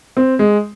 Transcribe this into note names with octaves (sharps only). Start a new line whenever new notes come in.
C4
G#3